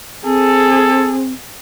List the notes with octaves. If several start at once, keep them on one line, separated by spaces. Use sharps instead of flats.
C4 G#4 A4